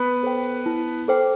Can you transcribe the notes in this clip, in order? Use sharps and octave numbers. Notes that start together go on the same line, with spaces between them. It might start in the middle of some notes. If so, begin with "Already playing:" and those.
Already playing: B3 B4
A4 C5 G5
E4
A4 C5 G5